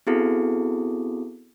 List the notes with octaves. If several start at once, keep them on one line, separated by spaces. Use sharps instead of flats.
B3 C4 E4 F#4 G#4 A4